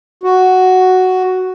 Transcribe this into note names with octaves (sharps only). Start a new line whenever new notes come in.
F#4